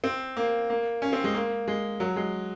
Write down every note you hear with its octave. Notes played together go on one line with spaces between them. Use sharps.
C4
A#3
A#3
C#4
C4
G#3
A#3
G#3
F#3
G#3